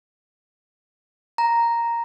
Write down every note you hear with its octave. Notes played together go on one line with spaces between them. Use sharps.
A#5